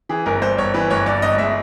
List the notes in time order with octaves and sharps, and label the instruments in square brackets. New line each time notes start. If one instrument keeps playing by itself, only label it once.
[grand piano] E3 G#4
G1 A#4
G2 C5
G1 C#5
E3 B4
G1 C#5
G2 D5
G1 D#5
G#3 E5